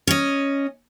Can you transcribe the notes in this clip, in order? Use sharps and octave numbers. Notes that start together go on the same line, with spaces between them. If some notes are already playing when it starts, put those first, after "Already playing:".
C#4 D#5